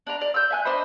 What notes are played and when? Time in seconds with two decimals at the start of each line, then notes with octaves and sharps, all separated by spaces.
0.07 D4 D5 A#5
0.21 D5
0.34 E6 G6
0.51 E5 G#5 F#6
0.65 D4 C5 D#5 B5